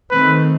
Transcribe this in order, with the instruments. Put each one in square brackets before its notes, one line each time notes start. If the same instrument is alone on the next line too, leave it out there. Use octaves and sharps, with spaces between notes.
[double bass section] D#3 A3 C4 [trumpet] B4